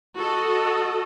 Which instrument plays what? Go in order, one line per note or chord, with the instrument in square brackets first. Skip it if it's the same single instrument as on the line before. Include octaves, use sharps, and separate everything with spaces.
[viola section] F#4 A4 D#5